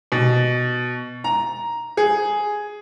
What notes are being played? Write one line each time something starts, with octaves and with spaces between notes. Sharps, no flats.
B2
A#5
G#4